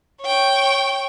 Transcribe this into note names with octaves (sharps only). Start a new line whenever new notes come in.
C#5 G5